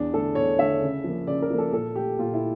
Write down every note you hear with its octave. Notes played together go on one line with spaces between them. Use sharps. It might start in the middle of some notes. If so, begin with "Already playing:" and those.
Already playing: E2 D4
D3 A3 A4
E2 C#5
D3 A3 E5
C#3
F3 A#3
C#3 D5
A#4
F3 A#3
A4
A#2 A4
A3 G4
A#2 F4
E4